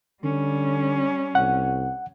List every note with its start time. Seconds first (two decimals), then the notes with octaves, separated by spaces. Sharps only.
0.24 D3 G3 C#4
1.35 C2 F#5